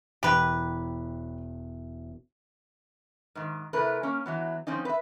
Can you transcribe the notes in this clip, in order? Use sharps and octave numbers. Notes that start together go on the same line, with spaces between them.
E1 G4 B4 A#5 G#6
G#2 D#3
C3 A3 E4 A#4 B4
A#3 C#4
E3 F#3 B3
F3 C4 C#4 D#4
B4 E5